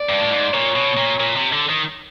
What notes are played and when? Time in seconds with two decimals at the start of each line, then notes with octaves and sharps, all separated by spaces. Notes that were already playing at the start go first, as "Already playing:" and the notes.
Already playing: D5
0.09 G2
0.20 A2
0.31 G#2
0.53 A#2 C#5
0.76 B2
0.97 A#2
1.20 A#2
1.36 C3
1.53 D3
1.70 D#3